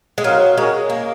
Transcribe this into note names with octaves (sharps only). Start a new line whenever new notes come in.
G#3
F#3 C4 D#4 A#4 F5
G#3 C#4 F#4 A#4
A#3